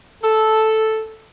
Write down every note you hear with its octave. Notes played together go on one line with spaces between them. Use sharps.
A4